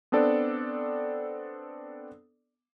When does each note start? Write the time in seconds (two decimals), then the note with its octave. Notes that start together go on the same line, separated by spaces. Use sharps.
0.12 B3 C4 D4 A4 D5